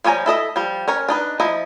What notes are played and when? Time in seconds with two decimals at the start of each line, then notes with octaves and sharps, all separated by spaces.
0.04 F3 G3 C#5 G#5 A#5
0.26 E4 A4 D#5 E5
0.56 F3 G3
0.88 C#4 A#4 C#5
1.09 D4 D#4 B4
1.40 F3 E4 D#5 A#5